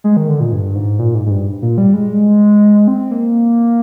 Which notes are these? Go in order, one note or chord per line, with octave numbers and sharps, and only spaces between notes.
G#3
D#3
D3
A#2
G2
G#2
A#2
G#2
G#2
G2
A#2
G3
G#3
C4
A#3